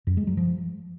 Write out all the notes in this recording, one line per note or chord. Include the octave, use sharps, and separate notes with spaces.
F#2
G#3
F#3
F3